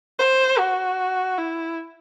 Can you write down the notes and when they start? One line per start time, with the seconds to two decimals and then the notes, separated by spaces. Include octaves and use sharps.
0.19 C5
0.59 F#4
1.38 E4